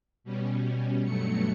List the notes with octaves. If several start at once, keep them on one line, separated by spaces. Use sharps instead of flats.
B2 G3 C#4
G2 B2 F#3 A3 C#7